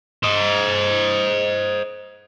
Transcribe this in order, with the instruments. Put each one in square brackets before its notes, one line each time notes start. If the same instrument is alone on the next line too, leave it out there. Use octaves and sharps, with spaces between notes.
[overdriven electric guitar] C5 D#5